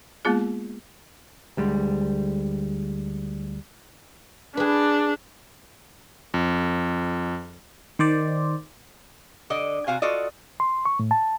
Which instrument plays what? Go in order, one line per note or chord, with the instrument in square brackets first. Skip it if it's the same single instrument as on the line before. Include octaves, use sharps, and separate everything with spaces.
[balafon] G#3 A#3 B3 F4 G#4
[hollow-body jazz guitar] D2 G3 G#3
[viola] D4 [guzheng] G#4 B4
[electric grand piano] F2
[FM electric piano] D#3 C5 D5
[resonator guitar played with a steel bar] D3 D5 D#5
C3 F#4 F5 G#5
F4 F#4 A4 D5 D#5
[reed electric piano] C6
C#6
A2
A5